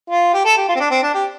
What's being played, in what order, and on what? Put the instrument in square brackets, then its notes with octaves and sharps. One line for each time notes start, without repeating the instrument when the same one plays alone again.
[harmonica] F4
G4
A4
G4
F4
C4
D4
C4
D4
G4